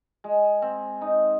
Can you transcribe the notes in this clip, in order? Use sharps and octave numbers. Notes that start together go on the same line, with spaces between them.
G#3
C4
D#4